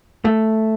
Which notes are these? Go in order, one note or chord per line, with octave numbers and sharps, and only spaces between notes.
A3